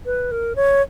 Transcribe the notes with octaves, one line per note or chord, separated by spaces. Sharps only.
B4
A#4
C#5